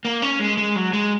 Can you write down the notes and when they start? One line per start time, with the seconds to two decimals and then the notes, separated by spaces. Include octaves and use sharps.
0.05 A#3
0.22 C#4
0.39 G#3
0.57 G#3
0.76 F#3
0.93 G#3